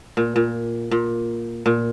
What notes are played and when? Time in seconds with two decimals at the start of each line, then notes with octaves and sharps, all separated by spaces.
0.17 A#2
0.36 A#2
0.91 A#2
1.66 A#2